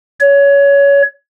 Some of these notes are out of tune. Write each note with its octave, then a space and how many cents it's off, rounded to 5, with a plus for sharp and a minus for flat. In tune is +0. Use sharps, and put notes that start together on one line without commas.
C#5 +20